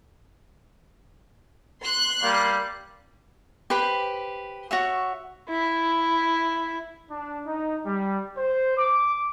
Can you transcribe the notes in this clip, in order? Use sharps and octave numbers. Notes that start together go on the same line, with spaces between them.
C6 F#6
G3 A#3 F5
G4 B4 C5 B5
F#4 C#5 E5
E4
D4
D#4
G3
C5
D6